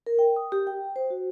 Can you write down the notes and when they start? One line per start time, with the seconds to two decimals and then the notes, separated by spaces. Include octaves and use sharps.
0.07 A#4
0.19 G5
0.36 D#6
0.52 G4
0.67 G5
0.96 C5
1.10 F#4